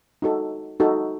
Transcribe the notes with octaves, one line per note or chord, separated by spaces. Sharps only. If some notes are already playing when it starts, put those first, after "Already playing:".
D#4 F#4 A4
D#4 F#4 A4